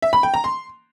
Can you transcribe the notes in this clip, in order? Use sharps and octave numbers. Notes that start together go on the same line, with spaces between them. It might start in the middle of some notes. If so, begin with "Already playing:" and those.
E5
B5
G5
A#5
C6